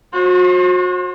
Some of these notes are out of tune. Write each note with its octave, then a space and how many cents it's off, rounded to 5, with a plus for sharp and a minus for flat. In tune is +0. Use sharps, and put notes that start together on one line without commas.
F#4 -35 C5 +35